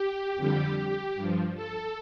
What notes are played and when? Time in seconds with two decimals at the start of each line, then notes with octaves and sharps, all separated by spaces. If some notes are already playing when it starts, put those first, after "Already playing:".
Already playing: G4
0.36 F2 D3 G3
0.76 G4
1.15 G2 F3
1.55 A4